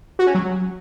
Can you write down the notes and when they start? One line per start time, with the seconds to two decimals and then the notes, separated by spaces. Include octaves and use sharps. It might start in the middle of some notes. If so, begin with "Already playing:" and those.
0.19 F#4
0.27 C#4
0.35 F#3